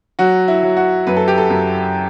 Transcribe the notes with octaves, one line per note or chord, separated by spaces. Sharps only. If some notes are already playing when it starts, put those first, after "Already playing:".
F#3 F#4
E4
F#3
F#4
F#2 B4
A4
G4
A4
F#2